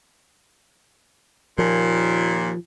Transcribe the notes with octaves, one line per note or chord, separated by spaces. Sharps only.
D#2 A#2 F3